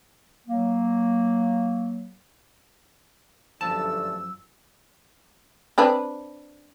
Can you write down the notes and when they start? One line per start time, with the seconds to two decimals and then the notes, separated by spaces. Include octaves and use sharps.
0.47 F#3 A#3
3.61 G1 F#2 D3 F3 A3 A5 E6
5.78 C4 D4 B4